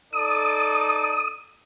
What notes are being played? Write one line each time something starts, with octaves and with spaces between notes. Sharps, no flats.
D#4 A4 D5 D#6